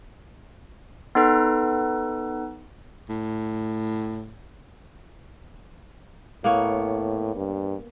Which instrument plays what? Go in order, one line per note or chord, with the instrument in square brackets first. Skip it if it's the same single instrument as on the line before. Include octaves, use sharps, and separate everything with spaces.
[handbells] B3 D#4 A4 B4
[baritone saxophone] A2
[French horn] A2 [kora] A#3 B3 C#5
[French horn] G2